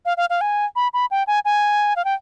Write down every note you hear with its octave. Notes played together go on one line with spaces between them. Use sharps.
F5
F5
F5
G#5
B5
B5
G5
G#5
G#5
F5
G5